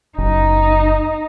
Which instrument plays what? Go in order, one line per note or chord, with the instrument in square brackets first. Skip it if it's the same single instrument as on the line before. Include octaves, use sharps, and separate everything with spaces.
[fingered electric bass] F#1 [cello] D#4